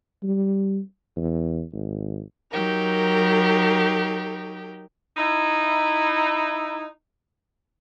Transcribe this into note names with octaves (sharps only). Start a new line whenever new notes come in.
G3
E2
G#1
F#3 D#4 G4 A#4
D#4 E4